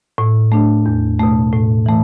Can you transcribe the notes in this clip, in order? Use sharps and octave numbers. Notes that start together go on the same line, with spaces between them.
A2
A3 D4
E2
B2 A3
A2
E3 A3